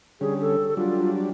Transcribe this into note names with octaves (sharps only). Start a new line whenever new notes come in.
D3 G3 C#4 G#4
A4
F#3 G3 D4 F4